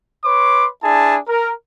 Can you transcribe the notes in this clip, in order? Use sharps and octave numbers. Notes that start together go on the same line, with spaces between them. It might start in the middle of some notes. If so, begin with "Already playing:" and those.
B4 C#5 C6 D6
D4 E4 G#4 A5
A#4